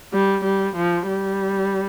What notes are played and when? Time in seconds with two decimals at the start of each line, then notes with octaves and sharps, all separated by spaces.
0.13 G3
0.44 G3
0.76 F3
1.07 G3